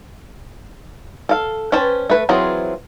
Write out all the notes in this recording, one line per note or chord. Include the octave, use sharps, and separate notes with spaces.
A4 F5
C#4 B4 C5 G5 A5
A3 B4
E3 F#3 C4 F4 G#4